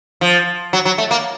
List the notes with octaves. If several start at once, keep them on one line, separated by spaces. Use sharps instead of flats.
F3
F#3
F#3
A3
A#3